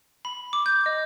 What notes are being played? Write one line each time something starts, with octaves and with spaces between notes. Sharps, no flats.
B5
D6
G6
D#5